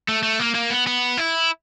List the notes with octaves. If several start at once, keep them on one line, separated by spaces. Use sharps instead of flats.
A3
A3
A#3
A#3
B3
B3
E4